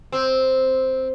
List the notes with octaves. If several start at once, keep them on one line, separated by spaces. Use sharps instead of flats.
C4